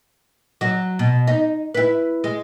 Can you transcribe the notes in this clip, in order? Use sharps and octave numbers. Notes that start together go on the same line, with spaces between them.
F#3 F#4
B2
D#4
E4 B4
G#3